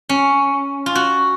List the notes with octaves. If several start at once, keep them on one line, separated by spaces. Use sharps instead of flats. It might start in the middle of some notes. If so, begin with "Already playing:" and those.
C#4
F4
F#4